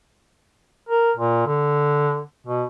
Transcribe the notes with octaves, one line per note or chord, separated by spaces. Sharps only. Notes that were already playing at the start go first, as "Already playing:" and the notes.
A#4
A#2
D3
B2